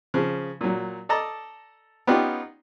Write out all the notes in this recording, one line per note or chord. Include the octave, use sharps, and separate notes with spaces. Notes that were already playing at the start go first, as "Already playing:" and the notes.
C#3 F3
A#2 F#3
A4 D5 D#5 A5 A#5
B3 C#4 D#4 F4 G4 D5